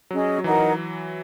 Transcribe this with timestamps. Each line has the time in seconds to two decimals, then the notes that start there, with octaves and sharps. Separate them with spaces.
0.11 F#3 C#4 G#4 D#5
0.38 F#3
0.44 E3 D#4 A#4 D#5 F#5